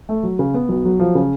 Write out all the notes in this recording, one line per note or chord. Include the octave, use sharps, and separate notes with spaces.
A3
F#3
C#3
B3
B1
F#3
F3
C#3